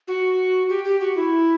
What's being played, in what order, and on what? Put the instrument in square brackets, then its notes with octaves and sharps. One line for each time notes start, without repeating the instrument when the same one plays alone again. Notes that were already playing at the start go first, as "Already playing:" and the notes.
[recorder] F#4
G4
G4
F#4
E4